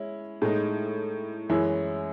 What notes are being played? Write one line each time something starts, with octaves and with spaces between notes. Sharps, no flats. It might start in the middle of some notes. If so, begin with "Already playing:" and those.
Already playing: G#3 C#4 E4
A2 G#3 D#4
F#2 E3 G#3 C#4 E4